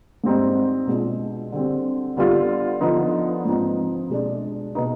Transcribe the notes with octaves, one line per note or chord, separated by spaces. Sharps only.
G#2 G3 C4 D#4
B2 G#3 D4 F4
D3 G3 C4
D3 G3 B3 F4
D3 F3 B3 D#4
G#2 F3 C4 D#4
B2 G#3 D4
B2 B3 D#4